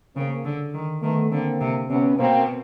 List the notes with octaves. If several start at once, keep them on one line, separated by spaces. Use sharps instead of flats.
C#3 A#3 C4
D3
D#3
D#3 A3 B3
D3 A#3 C4
C3
C3 B3 C#4
B2 A#3 C4